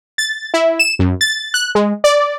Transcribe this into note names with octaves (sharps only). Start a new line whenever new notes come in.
A6
E4
E7
F#2
A6
F#6
G#3
D5